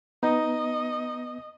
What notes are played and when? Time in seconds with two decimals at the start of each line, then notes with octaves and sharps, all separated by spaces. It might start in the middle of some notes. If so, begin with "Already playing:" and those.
0.23 B3 D#4 D#5